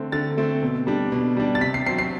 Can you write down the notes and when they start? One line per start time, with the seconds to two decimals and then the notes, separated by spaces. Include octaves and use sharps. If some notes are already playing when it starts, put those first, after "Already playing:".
Already playing: D3 A3 C4
0.12 D3 A6
0.37 A3 C4
0.62 B2
0.87 G3 D4
1.12 B2
1.37 G3 D4
1.55 A6
1.61 C3 B6
1.74 C7
1.86 F#3 C4 C7
1.99 C7